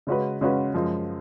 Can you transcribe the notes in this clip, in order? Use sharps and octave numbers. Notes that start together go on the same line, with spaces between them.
C#3 G#3 C#4 F#4 B4
C#3 G#3 C#4 F#4 B4
F#2 F3 G#3